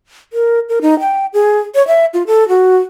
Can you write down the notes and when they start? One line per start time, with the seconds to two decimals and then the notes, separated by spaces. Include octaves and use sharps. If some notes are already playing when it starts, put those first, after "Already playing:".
0.33 A#4
0.69 A#4
0.82 D#4
1.00 G5
1.33 G#4
1.75 C#5
1.87 E5
2.14 F4
2.27 A4
2.49 F#4